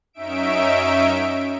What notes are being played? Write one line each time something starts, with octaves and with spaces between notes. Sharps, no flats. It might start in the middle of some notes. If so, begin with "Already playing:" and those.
F#2 C#4 D#4 E5 D7